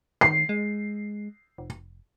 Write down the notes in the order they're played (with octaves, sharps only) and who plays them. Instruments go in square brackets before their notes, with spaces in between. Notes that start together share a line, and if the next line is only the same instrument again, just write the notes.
[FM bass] D#3 [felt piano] C7
[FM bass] G#3
F1